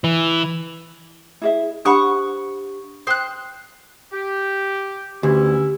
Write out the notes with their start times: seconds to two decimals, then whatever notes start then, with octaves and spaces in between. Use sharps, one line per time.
0.04 E3
1.42 E4 G#4 E5
1.85 D4 G4 C5 F#5 B5 C#6 D#6 F#6
3.07 C5 G5 D#6 F#6
4.12 G4
5.23 D2 B3 C#4 E4 G4